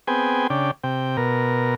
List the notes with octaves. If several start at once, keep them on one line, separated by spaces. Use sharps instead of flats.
B3 C4 G#4 G5 G#5
C#3 D4 G5
C3 G5
B2 A#4